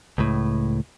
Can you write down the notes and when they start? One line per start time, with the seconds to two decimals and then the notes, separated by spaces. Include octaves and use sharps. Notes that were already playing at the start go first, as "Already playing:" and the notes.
0.18 C#2 A2